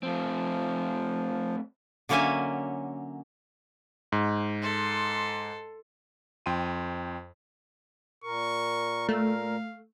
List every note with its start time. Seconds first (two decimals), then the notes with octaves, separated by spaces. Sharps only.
0.03 F3 A3 C4
2.09 D3 F#3 A#3 C#4 E5 G#5
4.12 G#2
4.62 A4 C6
6.46 F2 G5 C6 D#7
8.24 A#2 A#4 C#6
9.09 A3 F5